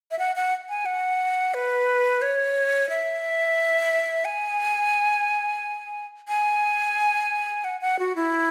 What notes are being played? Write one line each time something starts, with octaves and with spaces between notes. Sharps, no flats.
E5
F#5
F#5
G#5
F#5
B4
C#5
E5
G#5
G#5
F#5
F#5
F#4
E4